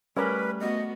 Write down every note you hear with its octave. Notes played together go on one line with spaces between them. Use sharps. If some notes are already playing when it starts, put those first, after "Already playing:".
G3 A3 C#4 A#4 B4
A3 B3 F#4 D#5